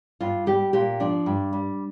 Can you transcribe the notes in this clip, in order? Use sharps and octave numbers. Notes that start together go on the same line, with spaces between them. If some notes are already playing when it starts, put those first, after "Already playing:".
G2 F4
G3 G4
A#2 G4
F3 D4
G2
G3